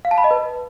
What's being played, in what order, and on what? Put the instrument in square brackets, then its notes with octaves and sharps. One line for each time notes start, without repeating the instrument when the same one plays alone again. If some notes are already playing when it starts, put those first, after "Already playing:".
[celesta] F5
A5
B5
D#5
B4